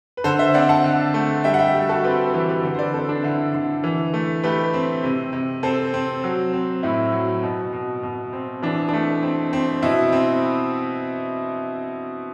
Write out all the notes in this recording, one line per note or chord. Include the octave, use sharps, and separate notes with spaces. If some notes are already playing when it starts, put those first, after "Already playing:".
B4
D3 A4 C5
C5 E5
C4 D5 F#5
F#5 A5
D3
A3
G3 E5 G5
F#5
E5 G5
G3
F#4 A4
C4 G4 B4
E3 G4 B4
G4 B4
D3
C5
B4 D5
C4 A4 C5
D4
D3 E4
D3
E3
A3
A3 G4 B4
C4
C3
C3
C4 A4 C5
C4
F#3
C4
A2 E4
F#3
B2
B2
B2
C4
E3 D4
A3 D4
C4
C4
B2 E4
C4